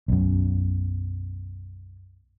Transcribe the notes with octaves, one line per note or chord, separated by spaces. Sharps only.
B1 F#2